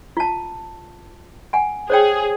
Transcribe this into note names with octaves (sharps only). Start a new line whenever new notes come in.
F4 A5
F#5 G#5
G#4 C5 C#5 G5